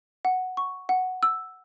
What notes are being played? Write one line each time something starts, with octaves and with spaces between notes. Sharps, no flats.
F#5
C#6
F#5
E6